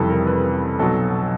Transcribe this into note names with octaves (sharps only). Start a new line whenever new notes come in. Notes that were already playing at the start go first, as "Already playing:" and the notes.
Already playing: F1 F2 C#3 E3 G3 A4 B4
A#4
B4
B1 B2 F#3 A4